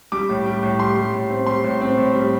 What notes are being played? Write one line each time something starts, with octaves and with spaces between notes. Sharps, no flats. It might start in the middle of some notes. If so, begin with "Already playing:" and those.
G3 D6
A2
G3
A2
G3 C6
G3
A2
C4
G3 C6
A2
C4
A2
G3